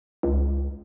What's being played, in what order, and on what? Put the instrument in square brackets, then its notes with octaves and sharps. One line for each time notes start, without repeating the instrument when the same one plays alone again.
[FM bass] C#2